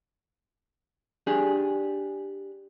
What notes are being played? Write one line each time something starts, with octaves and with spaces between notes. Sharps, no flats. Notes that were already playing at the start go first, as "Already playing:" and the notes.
D4 G4 G#4